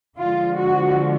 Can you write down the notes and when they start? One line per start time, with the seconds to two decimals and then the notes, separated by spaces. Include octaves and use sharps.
0.18 D3 F3 G#3 F4
0.58 F#4